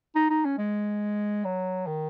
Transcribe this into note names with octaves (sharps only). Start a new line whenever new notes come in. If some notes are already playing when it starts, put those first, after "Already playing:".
D#4
D#4
C#4
G#3
F#3
D#3